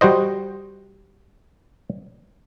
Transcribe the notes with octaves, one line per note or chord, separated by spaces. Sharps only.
G3 F#4 C5 D#5